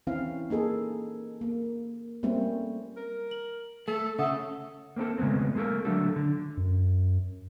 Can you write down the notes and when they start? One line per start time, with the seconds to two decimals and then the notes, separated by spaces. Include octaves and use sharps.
0.07 E3 C4 C#4 F5
0.50 A#3 D#4 G#4 A4
1.41 A#3
2.23 G3 A3 A#3 C4 C#4
2.97 A#4
3.31 F#7
3.88 A3 A4
4.19 C#3 A3 A4 E5 F#5 D#6
4.96 A#3 C4 D4 A4
5.18 C#3 G#3 A3 B3 C4
5.55 G#3 A#3 F#4 A4 A#4
5.85 D3 F#3 A3 D4 G4 A4
6.16 D3
6.57 F#2